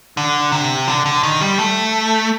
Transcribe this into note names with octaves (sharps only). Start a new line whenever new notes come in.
D3
C3
D3
D3
D#3
G3
A3